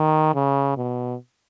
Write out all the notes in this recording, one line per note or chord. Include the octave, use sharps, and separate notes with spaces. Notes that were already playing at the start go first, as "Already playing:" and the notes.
Already playing: D#3
C#3
B2